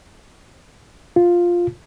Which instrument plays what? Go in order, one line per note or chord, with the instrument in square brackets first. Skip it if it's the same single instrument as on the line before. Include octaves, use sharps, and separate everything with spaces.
[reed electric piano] F4